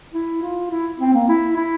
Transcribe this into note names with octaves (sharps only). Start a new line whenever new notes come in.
E4
F4
E4
C4
A#3
E4
E4